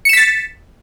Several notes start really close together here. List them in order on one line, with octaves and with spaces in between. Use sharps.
C#7 E7 B6 A6